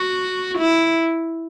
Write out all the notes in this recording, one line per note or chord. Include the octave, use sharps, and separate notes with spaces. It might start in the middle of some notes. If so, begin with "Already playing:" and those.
Already playing: F#4
E4